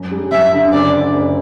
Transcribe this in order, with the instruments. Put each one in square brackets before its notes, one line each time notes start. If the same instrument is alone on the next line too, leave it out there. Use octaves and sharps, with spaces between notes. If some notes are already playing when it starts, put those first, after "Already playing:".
Already playing: [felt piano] F#2
G3
[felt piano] F#2 [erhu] E5
[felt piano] D3
[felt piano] F#1 [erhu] D5
[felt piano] D3
F#1